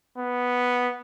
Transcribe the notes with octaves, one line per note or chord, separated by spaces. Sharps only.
B3